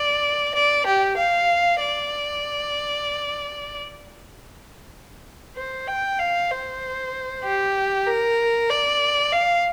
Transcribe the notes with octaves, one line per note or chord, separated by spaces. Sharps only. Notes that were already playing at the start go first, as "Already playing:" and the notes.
Already playing: D5
D5
G4
F5
D5
C5
G5
F5
C5
G4
A#4
D5
F5